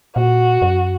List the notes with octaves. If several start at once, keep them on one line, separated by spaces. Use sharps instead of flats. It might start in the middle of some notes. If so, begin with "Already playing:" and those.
A#2 F#4
F#2